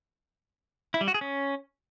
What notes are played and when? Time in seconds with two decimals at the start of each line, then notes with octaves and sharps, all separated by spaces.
0.94 E4
1.01 G3
1.08 F#4
1.14 G#4
1.21 C#4